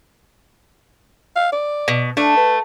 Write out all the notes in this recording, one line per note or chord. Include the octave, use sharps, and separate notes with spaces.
F5
D5
B2
A3 D4
B4